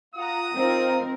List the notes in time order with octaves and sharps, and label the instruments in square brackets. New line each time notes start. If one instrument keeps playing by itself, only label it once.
[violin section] F4 F#5 A#5 [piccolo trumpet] D#6
[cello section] C4 A#4 [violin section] D#4 F4